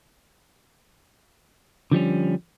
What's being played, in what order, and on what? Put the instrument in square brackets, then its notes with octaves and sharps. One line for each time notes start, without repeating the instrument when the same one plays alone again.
[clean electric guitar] D3 F3 G3 C#4